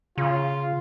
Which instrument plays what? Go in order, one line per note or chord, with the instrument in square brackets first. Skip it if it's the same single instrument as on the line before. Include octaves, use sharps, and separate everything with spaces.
[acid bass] C#3 [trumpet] F4